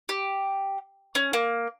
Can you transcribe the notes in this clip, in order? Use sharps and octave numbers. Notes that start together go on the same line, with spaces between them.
G4
C#4
A#3